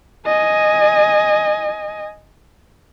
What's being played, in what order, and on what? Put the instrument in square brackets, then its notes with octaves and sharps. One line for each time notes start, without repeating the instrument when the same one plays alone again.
[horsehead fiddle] D#5 G#5